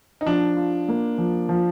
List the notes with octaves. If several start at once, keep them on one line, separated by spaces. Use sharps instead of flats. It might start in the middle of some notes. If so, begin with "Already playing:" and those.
D#4
F3 D4
F4
A#3
F3
F3